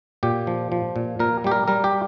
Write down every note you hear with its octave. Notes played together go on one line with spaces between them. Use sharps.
A#2 G4
F3
F3
A#2
A#2 A#4
G3 G4
A#4
G3 A#4
G4